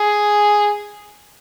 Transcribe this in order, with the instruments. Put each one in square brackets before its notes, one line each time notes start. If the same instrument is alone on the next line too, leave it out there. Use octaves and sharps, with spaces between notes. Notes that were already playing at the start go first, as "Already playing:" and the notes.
Already playing: [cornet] G#4